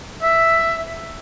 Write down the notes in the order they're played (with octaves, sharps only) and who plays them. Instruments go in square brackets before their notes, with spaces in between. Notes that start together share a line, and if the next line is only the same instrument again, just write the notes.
[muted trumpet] E5